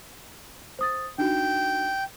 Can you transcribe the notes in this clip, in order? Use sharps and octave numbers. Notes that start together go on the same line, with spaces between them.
C5 D#6 A6
D4 D#4 F#4 G5